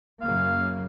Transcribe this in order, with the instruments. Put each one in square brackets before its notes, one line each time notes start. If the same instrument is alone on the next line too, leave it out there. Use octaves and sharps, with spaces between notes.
[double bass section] F#2 C#3 A#3 [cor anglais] F5